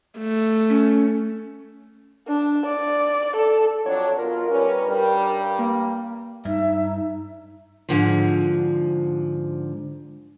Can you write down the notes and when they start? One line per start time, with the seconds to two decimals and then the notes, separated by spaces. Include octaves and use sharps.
0.19 A3
0.70 C#4
2.27 D4
2.66 D5
3.36 A4
3.86 F2 F#3 D4 C#5
4.18 B2 F4 A#4
4.49 G3 C#4 B4
4.87 G2 G3
5.59 A#3
6.45 G2 D#4 E5
7.89 G#2 D3 F3